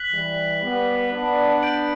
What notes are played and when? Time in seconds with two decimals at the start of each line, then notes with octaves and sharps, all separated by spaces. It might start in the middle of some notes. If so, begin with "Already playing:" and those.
Already playing: F#6 B6 F#7
0.11 E3 G3
0.62 G3 B3
1.12 B3 D4
1.62 G6 D7 F#7